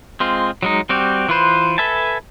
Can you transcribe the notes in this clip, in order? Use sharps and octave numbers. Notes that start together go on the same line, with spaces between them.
G#3 C4 F4
F#3 G#3 D#4
G3 C4 F#4 G4
E3 F4 B4 C5
A4 B4 E5 G#5 A5